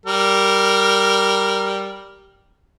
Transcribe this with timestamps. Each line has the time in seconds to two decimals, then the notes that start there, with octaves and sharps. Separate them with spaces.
0.06 G3 A#4